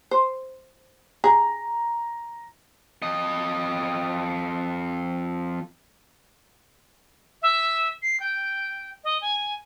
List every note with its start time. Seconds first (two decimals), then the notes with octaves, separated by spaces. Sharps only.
0.11 C5
1.24 G#4 A#5
3.02 F2 D#5
7.42 E5
8.02 C7
8.20 G5
9.04 D#5
9.22 G#5